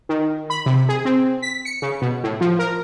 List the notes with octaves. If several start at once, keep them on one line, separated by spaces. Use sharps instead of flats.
D#3
B5
C3
G#4
C4
B6
C#7
C#3
B2
A2
F3
A#4